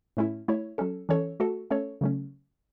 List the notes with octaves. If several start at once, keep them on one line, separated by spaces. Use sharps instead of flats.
A2 A3 C#4 E4
A3 E4 C#5
F#3 C#4 A4
E3 C#4 A4 C#5
A3 F#4 A4
A3 C#4 A4 C#5
C#3 F#3 A3 C#4